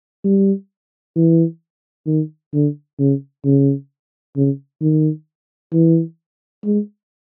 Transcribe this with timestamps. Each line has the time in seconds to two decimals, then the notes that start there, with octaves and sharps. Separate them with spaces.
0.25 G3
1.16 E3
2.07 D#3
2.53 D3
2.99 C#3
3.45 C#3
4.36 C#3
4.81 D#3
5.73 E3
6.65 G#3